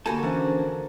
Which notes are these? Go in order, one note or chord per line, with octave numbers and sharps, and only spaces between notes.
D3 A#3 F#4 G4 A4 G#5 A5 B5
E3 C#4 D4 C5